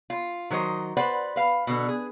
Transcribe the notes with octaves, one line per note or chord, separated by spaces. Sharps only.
F4
D#3 F#3 C5 D#5
B4 C5 D5 F#5
B4 F5
B2 D3
G#4